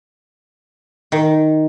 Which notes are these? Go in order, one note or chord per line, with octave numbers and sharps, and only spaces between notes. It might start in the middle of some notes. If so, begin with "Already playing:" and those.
D#3